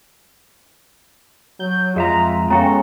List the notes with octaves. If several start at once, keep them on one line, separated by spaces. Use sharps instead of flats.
F#3 G6
F2 G#3 F4 E5 A#5
B3 C#4 F#4 A4 F5 G5 A#5